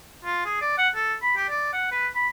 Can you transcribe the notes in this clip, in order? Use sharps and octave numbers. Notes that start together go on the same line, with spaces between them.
F4
G#4
D5
F#5
A4
B5
G4
D5
F#5
B4
B5